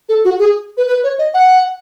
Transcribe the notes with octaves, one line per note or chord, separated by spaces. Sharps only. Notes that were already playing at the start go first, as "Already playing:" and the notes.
A4
F#4
G#4
B4
B4
C#5
D#5
F#5